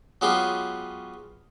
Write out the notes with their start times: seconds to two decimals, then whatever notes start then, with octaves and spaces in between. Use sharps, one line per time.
0.21 F#3 G#3 B3 C#4 F4 G4